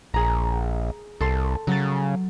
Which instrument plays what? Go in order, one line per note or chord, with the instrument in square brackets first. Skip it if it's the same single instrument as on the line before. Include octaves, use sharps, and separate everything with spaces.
[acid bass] A#1 [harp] G#4 A#5
[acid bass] C2 [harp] A4 C6
[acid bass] C#3 [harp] F#3 A6